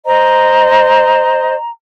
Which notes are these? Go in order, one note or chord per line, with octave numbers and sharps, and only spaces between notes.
C5 D#5 A#5